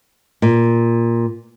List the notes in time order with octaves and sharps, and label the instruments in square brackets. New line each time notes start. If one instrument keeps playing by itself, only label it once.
[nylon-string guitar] A#2